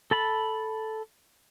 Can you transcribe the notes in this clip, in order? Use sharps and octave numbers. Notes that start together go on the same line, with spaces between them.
A4 A5 B5